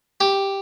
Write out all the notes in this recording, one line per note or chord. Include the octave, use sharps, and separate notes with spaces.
G4